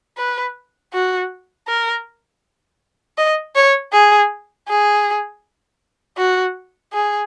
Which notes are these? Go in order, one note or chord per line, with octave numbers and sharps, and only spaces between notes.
B4
F#4
A#4
D#5
C#5
G#4
G#4
F#4
G#4